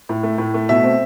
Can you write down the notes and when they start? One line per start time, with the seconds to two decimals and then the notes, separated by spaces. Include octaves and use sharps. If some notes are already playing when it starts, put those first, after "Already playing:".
0.09 A2
0.23 A3
0.38 A2
0.54 A3
0.69 B2 E5
0.84 C4